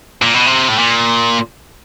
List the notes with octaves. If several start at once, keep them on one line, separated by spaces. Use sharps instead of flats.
A#2
B2
C3
A2
A#2